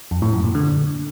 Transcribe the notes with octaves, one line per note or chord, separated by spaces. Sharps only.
F2
A2
F#2
A#2
D3